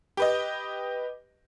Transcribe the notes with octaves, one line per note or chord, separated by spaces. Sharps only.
G4 B4 D#5